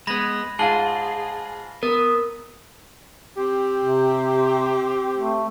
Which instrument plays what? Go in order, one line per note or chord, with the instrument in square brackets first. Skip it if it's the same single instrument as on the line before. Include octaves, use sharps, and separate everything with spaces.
[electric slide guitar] G#3 B3 [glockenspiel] B5 A#6
[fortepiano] G#2 F4 [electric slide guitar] G#4 [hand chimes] A5 [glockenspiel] G7
[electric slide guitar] B3 [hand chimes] A#4
[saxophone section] C4 G4
[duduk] C3
A3